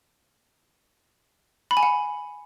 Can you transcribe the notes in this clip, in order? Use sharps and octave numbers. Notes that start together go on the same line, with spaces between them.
B5
G#5
F#5